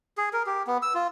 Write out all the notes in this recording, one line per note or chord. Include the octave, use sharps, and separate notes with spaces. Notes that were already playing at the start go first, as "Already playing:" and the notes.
G#4
A#4
G4
B3
E6
F4